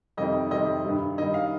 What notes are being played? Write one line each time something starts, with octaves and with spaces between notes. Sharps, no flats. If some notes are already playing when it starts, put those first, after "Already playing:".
F2 C3 D#3 G3 D#5
F2 C3 D#3 G3 D#5
G2 D#3 G3
G2 D#3 G3 D#5
F5